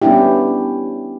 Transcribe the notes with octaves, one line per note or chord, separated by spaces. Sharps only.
G3 B3 C#4 D4 E4 G4